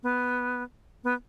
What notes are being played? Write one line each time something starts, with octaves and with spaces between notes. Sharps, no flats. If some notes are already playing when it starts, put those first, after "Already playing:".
B3
B3